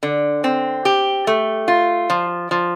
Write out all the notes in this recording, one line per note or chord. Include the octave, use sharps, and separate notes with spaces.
D3
C4
G4
A3
F4
F3
F3